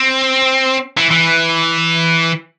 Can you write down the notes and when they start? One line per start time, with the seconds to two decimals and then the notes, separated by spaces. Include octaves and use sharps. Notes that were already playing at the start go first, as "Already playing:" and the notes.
Already playing: C4
0.97 E3
1.11 E3